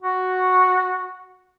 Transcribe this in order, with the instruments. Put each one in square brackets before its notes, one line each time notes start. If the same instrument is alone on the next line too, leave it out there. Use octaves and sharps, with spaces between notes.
[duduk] F#4